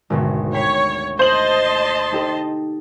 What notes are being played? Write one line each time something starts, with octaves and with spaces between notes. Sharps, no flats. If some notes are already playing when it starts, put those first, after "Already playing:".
G#1 D2 B2
C#5 G5 B5 C7
C5 D#5 A5 C6 F#7
D#4 G4 A4